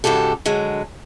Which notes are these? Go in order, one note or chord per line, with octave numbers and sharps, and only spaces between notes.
G#2 C#3 F#4 G4 A4
D3 F#3 G#3